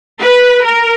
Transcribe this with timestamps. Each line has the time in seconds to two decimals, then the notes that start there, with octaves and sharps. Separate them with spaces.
0.21 B4
0.64 A#4